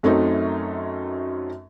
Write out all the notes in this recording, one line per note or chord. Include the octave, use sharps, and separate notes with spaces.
F#2 F#3 A3 C4 C#4 D#4